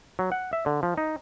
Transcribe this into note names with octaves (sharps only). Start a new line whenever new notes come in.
F#3
F#5
E5
D3
F3
D#4